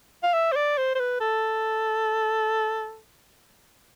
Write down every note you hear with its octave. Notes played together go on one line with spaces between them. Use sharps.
F5
E5
C5
D5
C5
C5
B4
A4